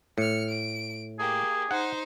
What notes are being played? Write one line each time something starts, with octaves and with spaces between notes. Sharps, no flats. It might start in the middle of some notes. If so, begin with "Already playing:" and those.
A2 F6 C#7
D7
A#3 G4 G#4
D#4 C5 F#5